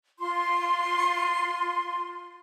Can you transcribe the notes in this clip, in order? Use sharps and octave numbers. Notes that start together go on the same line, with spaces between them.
F4 C6